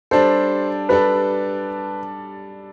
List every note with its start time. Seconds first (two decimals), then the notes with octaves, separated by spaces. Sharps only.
0.11 G3 D4 A4 C5
0.89 G3 D4 A4 B4